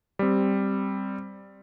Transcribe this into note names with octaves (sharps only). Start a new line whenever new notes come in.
G3 C4